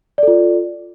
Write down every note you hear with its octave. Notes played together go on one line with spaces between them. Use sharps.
F4 A4 D5